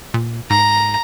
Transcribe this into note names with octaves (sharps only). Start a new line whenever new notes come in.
A#2
G#2 A#5